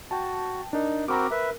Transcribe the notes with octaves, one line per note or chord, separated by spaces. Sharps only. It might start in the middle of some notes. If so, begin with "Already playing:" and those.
F#4 G5 A5
D4 D#4 A#4
C4 F#4 A#4 A#5 B5 D6
A#4 B4 E5